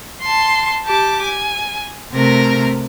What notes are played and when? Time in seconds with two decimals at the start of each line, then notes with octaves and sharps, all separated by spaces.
0.21 A5 C6
0.85 G4 A5 D6
1.22 G#5
2.13 C3 A3 A#4 A#6